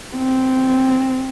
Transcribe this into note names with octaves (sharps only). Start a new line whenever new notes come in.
C4